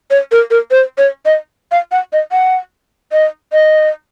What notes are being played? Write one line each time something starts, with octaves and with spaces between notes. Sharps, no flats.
C#5
A#4
A#4
C5
C#5
D#5
F5
F#5
D#5
F#5
D#5
D#5